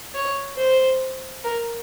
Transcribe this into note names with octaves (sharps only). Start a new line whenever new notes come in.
C#5
C5
A#4